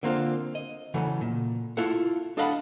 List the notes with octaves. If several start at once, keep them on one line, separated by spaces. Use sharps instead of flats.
D3 A#3 C4 F4
D#5
C#3 E3 F#3 A3
A#2
E4 F4 A4 F#5
D4 A4 D#5 F5 F#5 B5